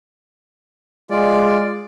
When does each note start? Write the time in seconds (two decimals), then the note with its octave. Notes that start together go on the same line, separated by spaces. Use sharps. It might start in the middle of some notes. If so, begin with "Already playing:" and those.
1.11 G#3 F4 D5